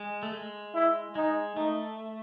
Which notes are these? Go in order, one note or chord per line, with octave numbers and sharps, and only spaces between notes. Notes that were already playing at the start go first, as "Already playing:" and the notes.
Already playing: G#3
A3
G#3
E4
G#3 D#4
A3 D#4